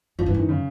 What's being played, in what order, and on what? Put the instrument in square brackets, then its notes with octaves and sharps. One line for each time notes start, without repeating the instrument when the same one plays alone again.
[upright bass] F#2 [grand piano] F3
[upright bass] G2 [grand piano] E3
[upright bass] F#2 [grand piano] D#3
[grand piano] C#3